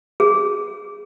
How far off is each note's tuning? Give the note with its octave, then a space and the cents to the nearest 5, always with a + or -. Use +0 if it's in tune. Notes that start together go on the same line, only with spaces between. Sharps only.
G#4 -10